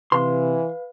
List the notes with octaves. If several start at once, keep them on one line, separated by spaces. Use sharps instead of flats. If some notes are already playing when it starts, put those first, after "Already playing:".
C3 E3 B4 F5 C6